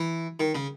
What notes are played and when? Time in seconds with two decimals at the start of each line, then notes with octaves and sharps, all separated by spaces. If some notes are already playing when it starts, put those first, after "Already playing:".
Already playing: E3
0.40 D#3
0.55 C#3